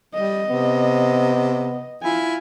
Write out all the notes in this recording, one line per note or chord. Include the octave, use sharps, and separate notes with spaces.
G3 D#5
C3 B3
E4 F4 G#5